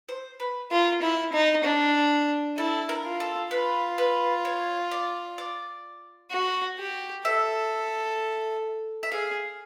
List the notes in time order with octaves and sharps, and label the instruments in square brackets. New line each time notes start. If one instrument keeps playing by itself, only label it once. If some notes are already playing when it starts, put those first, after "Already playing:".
[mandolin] C5
B4
[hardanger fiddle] F4 [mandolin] A#4
[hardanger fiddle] E4
D#4
D4
[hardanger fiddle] E4 [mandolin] A4
[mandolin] A#4
[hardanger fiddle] F4
[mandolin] A4
[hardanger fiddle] F4 [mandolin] B4
[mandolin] B4
C#5
D5
D5
[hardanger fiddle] F#4
G4
[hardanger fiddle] A4 [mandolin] E5
[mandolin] E5
[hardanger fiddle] G#4 [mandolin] F5